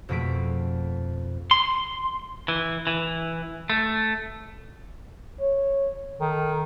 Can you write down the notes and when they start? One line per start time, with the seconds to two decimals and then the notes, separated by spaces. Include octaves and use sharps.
0.09 F2 B2 G#3 A3 B6 D7
1.51 C6
2.48 E3
2.87 E3
3.70 A3
5.40 C#5
6.20 D#3 A4